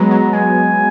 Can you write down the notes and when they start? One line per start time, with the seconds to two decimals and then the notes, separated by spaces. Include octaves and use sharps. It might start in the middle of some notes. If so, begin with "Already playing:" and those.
Already playing: F#3 G#3 B3 A#5
0.11 F#3
0.33 G#3 G#5